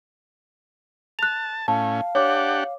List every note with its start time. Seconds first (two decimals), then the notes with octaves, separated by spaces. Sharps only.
1.19 A5 F#6 F7
1.68 A2 C#4 F5 A5
2.15 D4 G4 C#5 F#5 D6